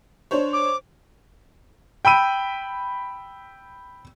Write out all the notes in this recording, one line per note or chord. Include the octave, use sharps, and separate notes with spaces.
D4 C5 C#5
D6
G5 B5 E6 D#7